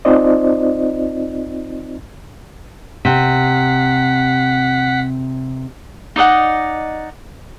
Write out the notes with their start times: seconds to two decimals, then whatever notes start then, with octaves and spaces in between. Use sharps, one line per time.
0.05 C4 D#4 F4 C5 D5 D#5
3.05 C3 F#5 B6
6.16 D#4 D5 D#5 F#5